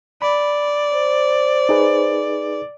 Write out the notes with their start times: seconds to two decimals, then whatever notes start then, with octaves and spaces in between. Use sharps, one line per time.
0.22 D5 B5
0.93 C5
1.69 D#4 G#4 B4